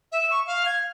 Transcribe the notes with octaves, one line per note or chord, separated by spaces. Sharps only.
E5
C#6
F5
G#6